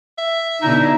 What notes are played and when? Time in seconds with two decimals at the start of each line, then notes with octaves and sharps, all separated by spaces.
0.18 E5
0.62 B2 D3 D#4 E4